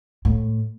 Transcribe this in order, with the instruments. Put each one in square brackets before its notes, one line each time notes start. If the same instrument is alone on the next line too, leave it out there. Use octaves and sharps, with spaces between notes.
[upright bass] A2